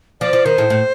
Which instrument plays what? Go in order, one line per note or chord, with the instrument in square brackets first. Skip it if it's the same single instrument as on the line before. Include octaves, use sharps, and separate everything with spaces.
[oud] F3 [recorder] D5
[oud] F3
[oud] D#3 [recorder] C5
[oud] A2
A2